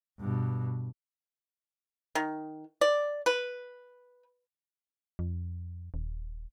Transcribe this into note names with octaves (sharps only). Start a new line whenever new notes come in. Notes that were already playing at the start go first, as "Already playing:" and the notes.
G2 B2
D#3
D5
B4
F2
D#1